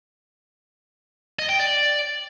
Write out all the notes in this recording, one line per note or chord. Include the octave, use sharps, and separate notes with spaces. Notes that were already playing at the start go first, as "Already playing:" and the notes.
D#5
G5
D5